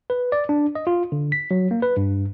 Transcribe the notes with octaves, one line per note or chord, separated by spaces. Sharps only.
B4
D5
D4
D#5
F4
D3
B6
F#3
A#3
B4
G2